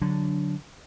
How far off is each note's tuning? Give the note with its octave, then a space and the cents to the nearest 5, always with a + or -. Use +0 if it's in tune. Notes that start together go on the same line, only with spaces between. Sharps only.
D3 -10 F#3 +0 D4 +0